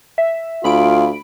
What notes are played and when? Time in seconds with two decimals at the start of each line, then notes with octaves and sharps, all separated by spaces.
0.18 E5
0.64 D2 F4 B5 D7